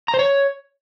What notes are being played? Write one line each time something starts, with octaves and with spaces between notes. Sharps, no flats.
A#5
C5
C#5